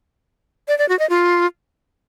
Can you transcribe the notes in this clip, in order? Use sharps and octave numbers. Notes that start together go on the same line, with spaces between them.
D5
D5
F#4
D#5
F4